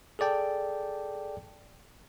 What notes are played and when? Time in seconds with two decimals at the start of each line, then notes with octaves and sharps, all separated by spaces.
0.19 G#4 A4 D5 G5 A5